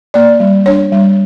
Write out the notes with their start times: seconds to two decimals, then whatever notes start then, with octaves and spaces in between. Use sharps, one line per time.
0.14 A#3 D5
0.40 G3
0.66 D4 C#5
0.92 G3